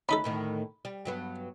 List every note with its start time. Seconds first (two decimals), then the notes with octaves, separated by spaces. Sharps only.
0.09 D2 C#4 D#4 A4 B5
0.24 D2 A2 D#3
0.85 G3
1.05 G2 F#3 B3